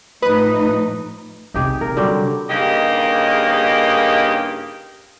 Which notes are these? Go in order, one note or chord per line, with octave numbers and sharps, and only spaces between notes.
A2 F3 D#4 B4 D#6
E2 C3 D#4 G4 G#4
A#4
D3 F#3 G3
G2 C#3 A#3 D#4 G4 D#5